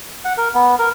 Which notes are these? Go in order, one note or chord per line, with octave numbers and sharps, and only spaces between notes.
F#5
A#4
B3
A#4